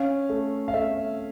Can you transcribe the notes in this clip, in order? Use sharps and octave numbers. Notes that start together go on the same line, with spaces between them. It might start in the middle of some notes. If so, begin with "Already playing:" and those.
Already playing: C#4 F5
A3
F5
A3 E5